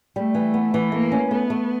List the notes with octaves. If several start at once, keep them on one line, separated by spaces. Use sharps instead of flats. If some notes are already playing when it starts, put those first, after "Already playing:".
G3 A3
E3
B3
E3
A3 A#3
C#4
A3 B3
A3